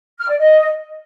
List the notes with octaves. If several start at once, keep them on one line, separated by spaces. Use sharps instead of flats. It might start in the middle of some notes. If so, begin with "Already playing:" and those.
F6
D5
D#5